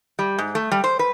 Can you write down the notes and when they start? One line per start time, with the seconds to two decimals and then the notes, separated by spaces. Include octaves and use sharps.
0.19 G3
0.38 G#2
0.55 A3
0.71 G3
0.84 C5
0.99 B4